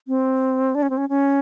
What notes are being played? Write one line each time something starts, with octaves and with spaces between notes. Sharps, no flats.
C4
D4
C#4
C4
C#4
C#4